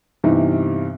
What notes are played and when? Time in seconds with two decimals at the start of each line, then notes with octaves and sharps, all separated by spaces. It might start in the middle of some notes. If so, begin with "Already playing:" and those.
0.24 G2 C3 E3 B3 D#4